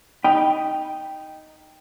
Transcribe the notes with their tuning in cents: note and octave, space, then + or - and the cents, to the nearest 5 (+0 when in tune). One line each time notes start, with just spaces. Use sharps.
D#4 +0 G5 +0 B5 +0